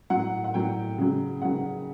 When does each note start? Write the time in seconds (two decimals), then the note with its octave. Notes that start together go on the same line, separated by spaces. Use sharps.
0.10 A2 F#3 F#5
0.44 F#5
0.54 A2 F#3 G5
0.98 C#3 F#3
1.42 C#3 F#3 F#5